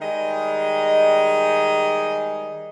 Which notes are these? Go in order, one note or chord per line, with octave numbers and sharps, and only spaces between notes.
D#3 G3 G#3 G#4 D#5